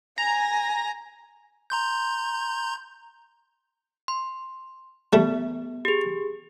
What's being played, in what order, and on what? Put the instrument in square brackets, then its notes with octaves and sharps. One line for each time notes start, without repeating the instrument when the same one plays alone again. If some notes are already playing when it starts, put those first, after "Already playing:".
[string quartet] G#5 [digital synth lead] A#5
[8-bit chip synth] A#5 C6 G6
[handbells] C6
[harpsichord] G3 A3 [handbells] B3
[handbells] G4 G#4